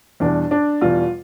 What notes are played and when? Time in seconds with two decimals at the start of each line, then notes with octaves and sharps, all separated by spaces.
0.20 E2 B2 G3 D4
0.51 D4
0.81 E2 B2 G3 F4